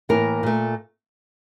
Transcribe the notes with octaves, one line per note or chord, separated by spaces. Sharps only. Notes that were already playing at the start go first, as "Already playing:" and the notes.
A2 E3 A#3 A#4
A#2 A3